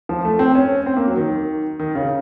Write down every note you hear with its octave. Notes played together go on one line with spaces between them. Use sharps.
F3
A3
C4
C#4
C4
A#3
F#3
D#3
D#3
C#3